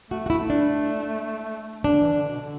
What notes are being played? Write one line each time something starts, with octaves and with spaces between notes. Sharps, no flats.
A3 F#4
F#4
E4
A3
D4
D3 D4
E3
D3
B2
D3